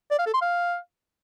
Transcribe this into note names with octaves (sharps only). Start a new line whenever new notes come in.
D5
F5
A4
C6
F5